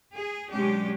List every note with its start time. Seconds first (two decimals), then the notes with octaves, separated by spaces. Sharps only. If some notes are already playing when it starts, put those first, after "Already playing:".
0.14 G#4
0.50 B2 F#3 G#3 C#4 D4 G4